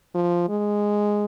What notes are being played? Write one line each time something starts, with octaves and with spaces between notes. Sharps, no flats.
F3
G#3